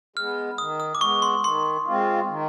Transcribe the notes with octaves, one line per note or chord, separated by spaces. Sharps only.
G#3 B3 F6
D#3 D#6
D#6
D6
G#3 B3 C#6
C6
D#3 C6
G#3 C4 F4
D#3